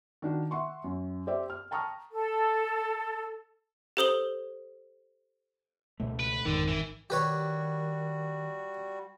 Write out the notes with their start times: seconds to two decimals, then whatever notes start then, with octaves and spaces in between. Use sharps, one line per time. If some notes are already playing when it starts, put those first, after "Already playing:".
0.22 D#3 D4 F#4
0.51 E5 F#5 C6 C#6
0.84 F#2
1.27 G4 C5 D5 E5
1.50 F6
1.71 G5 A5 A#5 C#6 D#6 F6
2.12 A4
3.97 G4 A4 C5 D#6 F#7 G7
6.00 C#2 B2 A3
6.19 B4
6.45 G#1 F2 G#2 D3 D#3
6.68 E3
7.10 D#3 G3 F#4 G4 B4 C#5